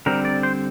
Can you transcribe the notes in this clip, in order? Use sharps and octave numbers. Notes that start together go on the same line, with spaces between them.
D3 G3 C4 A#4
D5
C5